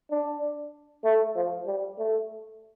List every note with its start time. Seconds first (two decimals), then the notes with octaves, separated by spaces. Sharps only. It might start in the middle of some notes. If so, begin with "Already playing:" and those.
0.11 D4
1.04 A3
1.36 F3
1.66 G3
1.98 A3